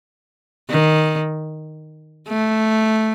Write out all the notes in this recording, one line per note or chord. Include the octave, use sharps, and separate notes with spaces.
D#3
A3